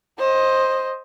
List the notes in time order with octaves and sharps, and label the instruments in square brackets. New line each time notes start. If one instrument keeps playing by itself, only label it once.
[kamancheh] C5 D#5